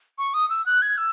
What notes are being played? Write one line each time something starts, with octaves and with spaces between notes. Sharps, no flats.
C#6
D#6
E6
F#6
G#6
E6